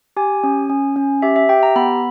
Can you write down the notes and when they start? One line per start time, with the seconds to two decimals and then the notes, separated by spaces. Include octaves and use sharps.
0.16 G4 G#5
0.44 C#4
0.69 C#4
0.96 C#4
1.22 G4 E5
1.36 E5
1.49 G4 G5
1.63 A#5
1.76 B3 B5